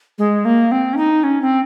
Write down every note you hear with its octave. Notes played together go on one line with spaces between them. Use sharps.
G#3
A#3
C4
C#4
D#4
C#4
C4